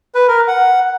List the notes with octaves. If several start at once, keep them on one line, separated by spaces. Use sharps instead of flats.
B4
A#4
F#5